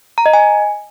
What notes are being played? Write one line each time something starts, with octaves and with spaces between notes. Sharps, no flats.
A#5
D#5
G#5